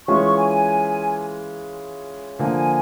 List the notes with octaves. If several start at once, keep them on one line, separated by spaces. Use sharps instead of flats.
E3 G#3 C#4 F4 C#6
G#5
D3 F3 A#3 G#5